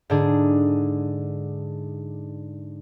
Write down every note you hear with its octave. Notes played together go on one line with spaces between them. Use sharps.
G#2 D3 D4 G#4